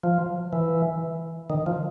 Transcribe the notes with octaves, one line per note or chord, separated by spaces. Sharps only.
F3
E3
D#3
F3